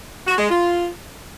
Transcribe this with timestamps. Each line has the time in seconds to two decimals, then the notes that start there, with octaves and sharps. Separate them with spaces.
0.26 F#4
0.38 G#3
0.49 F4